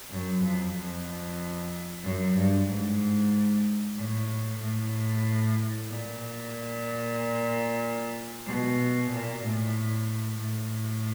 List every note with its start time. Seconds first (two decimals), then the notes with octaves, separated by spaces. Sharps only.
0.10 F#2
0.43 F2
0.75 F2
2.03 F#2
2.35 G2
2.68 G#2
3.97 A2
4.61 A2
5.89 A#2
8.47 B2
9.10 A#2
9.43 A2
10.39 A2